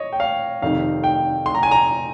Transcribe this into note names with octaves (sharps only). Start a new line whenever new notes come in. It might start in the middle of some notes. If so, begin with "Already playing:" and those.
Already playing: C#5 D#5
G5
F5
F1 F2 C3 D#3 F5
G5
C6
A#5
G#5
A#5